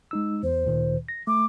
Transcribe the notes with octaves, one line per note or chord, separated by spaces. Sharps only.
G#3 D#4 E6
E2 C5
D2 A#2 D#3
A#6
A3 D6